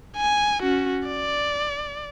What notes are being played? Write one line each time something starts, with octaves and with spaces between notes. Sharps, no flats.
G#5
C#4 F#4
D5